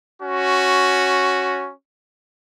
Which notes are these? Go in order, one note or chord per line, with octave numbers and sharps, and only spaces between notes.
C#4 F#4